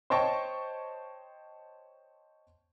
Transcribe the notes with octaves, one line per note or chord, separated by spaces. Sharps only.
C5 C#5 D#5 G5 A5 C#6